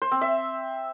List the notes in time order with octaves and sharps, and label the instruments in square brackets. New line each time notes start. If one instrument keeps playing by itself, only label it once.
[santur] C5
C4
E5